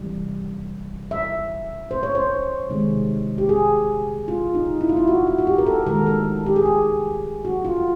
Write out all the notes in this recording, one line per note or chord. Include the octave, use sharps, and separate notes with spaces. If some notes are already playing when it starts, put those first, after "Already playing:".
Already playing: C3 E3 G3
E5
C5
C#5
C5
C3 D#3 G#3
G4
G#4
F4
D#4
E4
F4
E4
F#4
F#4
F#4
G4
A#4
A4
D#3 G#3 A#4
A4
G4
G#4
G4
F#4
F4